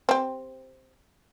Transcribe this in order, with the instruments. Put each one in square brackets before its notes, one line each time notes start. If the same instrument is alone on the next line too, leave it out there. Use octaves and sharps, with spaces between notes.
[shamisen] C4 G4